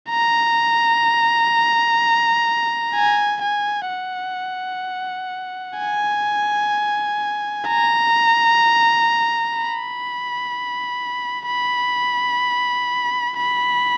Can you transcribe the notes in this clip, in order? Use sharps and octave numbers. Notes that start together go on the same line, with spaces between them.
A#5
G#5
G#5
F#5
G#5
A#5
B5
B5
B5